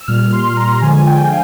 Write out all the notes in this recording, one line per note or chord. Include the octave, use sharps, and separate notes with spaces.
E6
A#2 G3 F6
C6
A#5
D3 F3 G#3 G#5
G5
F5